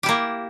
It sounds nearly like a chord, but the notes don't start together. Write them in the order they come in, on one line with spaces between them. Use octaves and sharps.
G4 E4 A#3